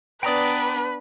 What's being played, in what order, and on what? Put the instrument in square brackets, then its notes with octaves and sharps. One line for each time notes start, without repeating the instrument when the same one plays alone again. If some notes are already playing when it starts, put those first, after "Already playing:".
[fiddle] B3 D4 [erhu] B4 [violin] D5 [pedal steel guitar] G5 A#5 D#6